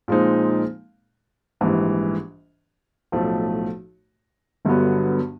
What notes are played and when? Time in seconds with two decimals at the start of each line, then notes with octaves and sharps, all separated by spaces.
0.08 A#2 F3 G#3 C4 D#4
1.61 A#1 G#2 E3 G3
3.12 B1 A2 F3 A3
4.65 G1 G2 D3 F#3 B3